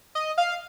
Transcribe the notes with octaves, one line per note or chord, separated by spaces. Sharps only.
D#5
F5